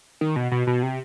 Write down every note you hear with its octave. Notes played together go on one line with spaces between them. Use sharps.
D#3
B2
B2
B2
C3